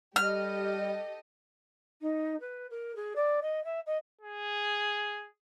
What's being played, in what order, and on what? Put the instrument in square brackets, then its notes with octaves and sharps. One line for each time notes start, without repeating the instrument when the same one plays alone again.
[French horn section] G3 [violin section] G4 A4 D#5 [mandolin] F6
[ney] D#4
B4
A#4
G#4
D5
D#5
E5
D#5
[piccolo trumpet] G#4